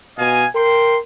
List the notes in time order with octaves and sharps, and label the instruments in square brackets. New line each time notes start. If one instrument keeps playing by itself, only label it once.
[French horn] B2 [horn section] D#5 F5 G#5
[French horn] A#4 [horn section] G5 C6